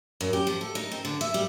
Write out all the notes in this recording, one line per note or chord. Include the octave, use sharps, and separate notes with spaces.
F#2
G4
F3
A4
D#4
C4
D3
E5
G3